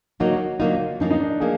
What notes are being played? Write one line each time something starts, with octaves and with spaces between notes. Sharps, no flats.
D3 F#3 A#3 D#4 F#4
D3 F#3 A#3 D#4 F4
F#2 F3 A#3 D#4
D#4
D4
F3 A#3 G#4